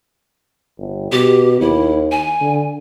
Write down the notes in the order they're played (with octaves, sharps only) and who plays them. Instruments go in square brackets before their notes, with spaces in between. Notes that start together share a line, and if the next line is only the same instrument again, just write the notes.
[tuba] G1
[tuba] B2 [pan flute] G4
[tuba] D#2 [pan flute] E4
[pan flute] G#5
[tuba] D3